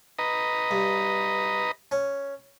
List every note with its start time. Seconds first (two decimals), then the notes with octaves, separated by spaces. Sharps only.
0.19 B4 D#5 A#5
0.71 G2
1.91 C#4